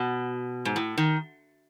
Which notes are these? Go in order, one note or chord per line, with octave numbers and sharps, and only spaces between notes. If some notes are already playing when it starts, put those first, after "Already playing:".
Already playing: B2
G#2
A2
D#3